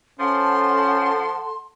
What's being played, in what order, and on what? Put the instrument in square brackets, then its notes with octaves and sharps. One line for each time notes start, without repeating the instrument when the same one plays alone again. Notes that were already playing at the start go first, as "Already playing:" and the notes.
[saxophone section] F3 [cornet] C#4 [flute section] A4 F#5 A5 [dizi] C6